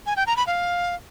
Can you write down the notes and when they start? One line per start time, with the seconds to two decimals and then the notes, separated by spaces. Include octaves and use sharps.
0.06 G#5
0.16 G5
0.26 A#5
0.37 B5
0.47 F5